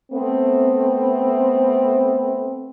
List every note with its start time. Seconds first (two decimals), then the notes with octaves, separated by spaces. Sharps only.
0.12 A3 B3 C4